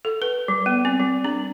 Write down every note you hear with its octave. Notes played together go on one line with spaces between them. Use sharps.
A4
B4
G3
B3
C4
G3
D4